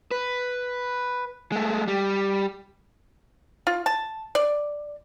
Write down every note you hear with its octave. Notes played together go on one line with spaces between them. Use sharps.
B4
G#3 A3
G3
F4
A5
D5